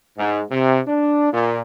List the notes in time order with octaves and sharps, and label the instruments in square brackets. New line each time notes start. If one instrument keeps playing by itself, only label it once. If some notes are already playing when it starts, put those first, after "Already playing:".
[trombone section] G#2
C3
D4
A#2